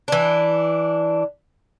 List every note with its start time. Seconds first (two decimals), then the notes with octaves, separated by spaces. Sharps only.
0.08 E3 D4